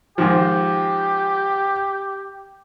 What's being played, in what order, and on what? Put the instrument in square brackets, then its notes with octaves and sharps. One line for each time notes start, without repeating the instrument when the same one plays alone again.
[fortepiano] G#2 D#3 F3 [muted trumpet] G4